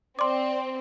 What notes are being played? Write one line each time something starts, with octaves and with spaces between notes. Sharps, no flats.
C4 D5 C6 D6